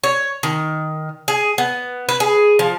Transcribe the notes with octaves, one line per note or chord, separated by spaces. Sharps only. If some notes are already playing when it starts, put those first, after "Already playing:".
C#5
D#3
G#4
B3
B4
G#4
F3